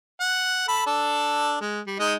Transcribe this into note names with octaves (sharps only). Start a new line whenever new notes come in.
F#5
A4 B5
D4 A4
G#3
G3
G#3 D#4 D#5